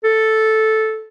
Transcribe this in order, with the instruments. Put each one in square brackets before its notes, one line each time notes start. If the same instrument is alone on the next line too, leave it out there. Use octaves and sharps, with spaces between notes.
[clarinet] A4